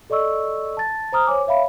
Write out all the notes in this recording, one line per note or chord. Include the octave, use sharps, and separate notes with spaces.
A4 D5 D#5 C#6 E6
A5 A6
C5 A#5 D#6 F6
C5 C#5 G#5 D6
C#5 E5 F5 B5